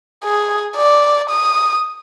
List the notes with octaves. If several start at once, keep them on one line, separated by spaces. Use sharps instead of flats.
G#4
D5
D#6